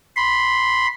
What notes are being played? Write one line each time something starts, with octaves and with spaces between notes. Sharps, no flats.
B5 C6